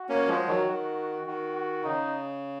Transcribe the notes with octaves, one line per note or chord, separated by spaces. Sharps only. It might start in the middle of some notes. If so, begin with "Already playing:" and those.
Already playing: F#4
A#3 C#4
F3 G#3
D#3 F#3
D#3
D#3 F#4
F#4
C#3 D#4